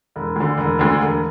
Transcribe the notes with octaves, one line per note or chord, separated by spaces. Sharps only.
E1
D2 D3
E1
D2 D3
E1